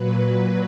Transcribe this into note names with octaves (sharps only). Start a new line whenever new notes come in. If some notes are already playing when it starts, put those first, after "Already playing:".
Already playing: A#2 F#3 B4